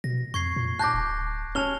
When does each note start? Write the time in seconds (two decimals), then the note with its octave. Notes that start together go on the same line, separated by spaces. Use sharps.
0.04 B2 A#6
0.34 F2 C#6 G#6 C7
0.56 A#2
0.79 A5 D6 F#6 G6 A#6
0.94 D1
1.55 C#4 A5 F6 F7 G7